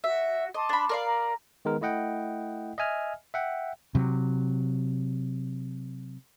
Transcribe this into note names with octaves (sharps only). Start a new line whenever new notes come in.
F#4 E5
D#5 A5 C6 D6
D4 B5
A#4 D5 F5
A#5
D#3 G#3 B3 A#4
A3 E4 D#5 F#5 G5
D#5 E5 G#5 F6
E5 F#5 G5
C3 F#3